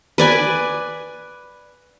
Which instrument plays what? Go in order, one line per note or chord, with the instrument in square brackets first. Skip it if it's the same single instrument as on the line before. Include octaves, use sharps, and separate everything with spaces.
[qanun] B4 D5 G#5